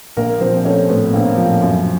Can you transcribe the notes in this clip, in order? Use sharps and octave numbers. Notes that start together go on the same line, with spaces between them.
A#1 A#3 A#4
F3 C4 C5
A3 C#4 C#5
A2 B3 B4
A#1 A#3 A#4
F3
F#2